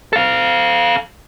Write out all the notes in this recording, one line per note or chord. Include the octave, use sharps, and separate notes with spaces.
A4 F5